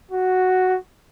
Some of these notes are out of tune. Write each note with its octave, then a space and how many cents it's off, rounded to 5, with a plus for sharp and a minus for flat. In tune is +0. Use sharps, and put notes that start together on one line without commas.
F#4 +0